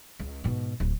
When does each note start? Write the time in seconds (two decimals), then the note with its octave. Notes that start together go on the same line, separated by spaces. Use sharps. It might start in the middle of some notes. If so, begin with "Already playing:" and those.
0.19 C#2
0.44 G#2 B2
0.80 D1